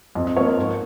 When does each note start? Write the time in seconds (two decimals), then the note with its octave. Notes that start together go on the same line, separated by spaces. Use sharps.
0.15 F2 D#5
0.27 D#5
0.37 F3 A#3 C#5
0.48 A#4
0.58 G#2